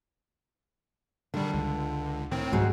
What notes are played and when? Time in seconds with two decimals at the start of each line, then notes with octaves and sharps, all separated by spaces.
1.34 D3 D#3 G3
1.54 C#2
2.31 A2 D#3 C4
2.52 C2 G#2 G#3 F#4